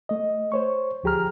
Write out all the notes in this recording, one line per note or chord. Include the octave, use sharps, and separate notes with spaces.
A3 D#5
C5 C#5 C#6
D2 F3 G4 G#4 A#5 F6